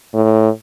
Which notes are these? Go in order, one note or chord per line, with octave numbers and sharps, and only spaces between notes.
A2